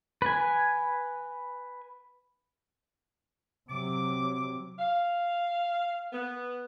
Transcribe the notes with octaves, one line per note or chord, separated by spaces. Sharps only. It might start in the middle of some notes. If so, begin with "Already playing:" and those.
B4 G#5
C3 F#3 D6
F5
B3